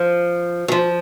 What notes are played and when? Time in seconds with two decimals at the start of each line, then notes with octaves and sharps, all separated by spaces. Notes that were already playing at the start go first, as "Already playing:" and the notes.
Already playing: F3
0.68 F#3
0.72 F3